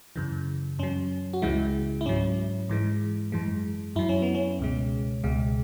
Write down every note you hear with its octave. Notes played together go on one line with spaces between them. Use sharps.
F#2 C#3 E3
F#2 F#3 C#4
F#4
C#2 C#3 E3 G#3 E4
E4
G#2 F#3 C#4
G#2 E3 G#3
F#2 E3 G#3
F#2 F#3 E4
C#4
B3
C#4
C#2 B2 G#3
C#2 B2 G#3